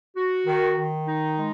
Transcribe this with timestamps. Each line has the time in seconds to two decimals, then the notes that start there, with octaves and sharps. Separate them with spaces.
0.17 F#4
0.46 D#3
0.77 D#3
1.07 D#4
1.37 G#3